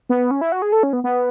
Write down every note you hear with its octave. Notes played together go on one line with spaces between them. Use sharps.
B3
C#4
E4
F#4
G#4
A4
C#4
B3
B3